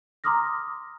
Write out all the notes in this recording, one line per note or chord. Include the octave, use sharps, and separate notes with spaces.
A#5 C6 D6 D#6 F6 A#6